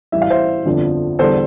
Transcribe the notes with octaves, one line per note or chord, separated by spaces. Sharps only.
A1 A2 E3 G3 E5
F5
C5 E5
G1 F2 D3 F3
E2 D3 G3 A4 C5